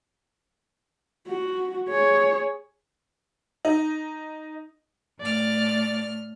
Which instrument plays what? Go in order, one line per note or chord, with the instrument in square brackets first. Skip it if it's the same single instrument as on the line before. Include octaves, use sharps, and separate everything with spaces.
[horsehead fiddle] F#4
G#4 C#5
[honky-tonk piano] D#4
[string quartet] A2 F6 [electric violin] D5